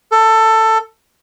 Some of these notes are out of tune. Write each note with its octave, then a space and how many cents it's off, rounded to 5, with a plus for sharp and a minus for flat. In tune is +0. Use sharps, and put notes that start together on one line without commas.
A4 +15